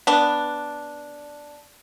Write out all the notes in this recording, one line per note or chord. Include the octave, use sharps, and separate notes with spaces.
B3 D4